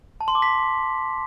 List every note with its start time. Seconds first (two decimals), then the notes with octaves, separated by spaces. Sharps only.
0.21 A5
0.28 C6
0.35 D6
0.42 B6